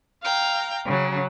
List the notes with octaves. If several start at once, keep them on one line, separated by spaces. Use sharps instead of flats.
F5 G5 A#5
C#3 F#3